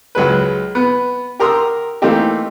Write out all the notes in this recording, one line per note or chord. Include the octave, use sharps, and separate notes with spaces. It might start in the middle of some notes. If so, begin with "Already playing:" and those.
C#2 F#3 G#3 B4
B3
G4 A#4 A#5 C6 D#6 E6
E3 A3 A#3 C4 D#4 G4